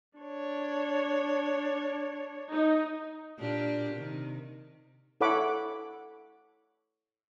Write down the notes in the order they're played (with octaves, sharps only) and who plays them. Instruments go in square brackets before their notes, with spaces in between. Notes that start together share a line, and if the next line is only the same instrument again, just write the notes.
[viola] D4 C#5
[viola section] D#4
[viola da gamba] A#2 D4 G4
C3 D#3
[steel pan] E4 A4 C#5 F#5 B5 D6